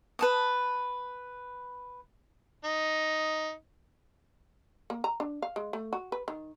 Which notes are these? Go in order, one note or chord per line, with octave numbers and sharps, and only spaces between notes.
B4 A5 D#6
D#4
A#3
A#5
D4
F5
G#3
A3
F#4
B4
D#3